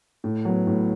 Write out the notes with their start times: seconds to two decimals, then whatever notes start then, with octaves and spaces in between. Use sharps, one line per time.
0.24 A2
0.45 F#3 B3
0.67 A2